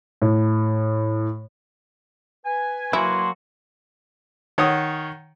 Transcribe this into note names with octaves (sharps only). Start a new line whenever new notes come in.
A2
B4 G#5
F#3 A#3 E4 F#4 C6
D#3 C#5 F#5 D#6